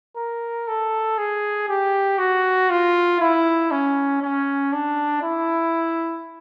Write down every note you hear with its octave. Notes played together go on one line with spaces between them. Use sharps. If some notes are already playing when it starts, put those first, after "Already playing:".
A#4
A4
G#4
G4
F#4
F4
E4
C#4
C#4
D4
E4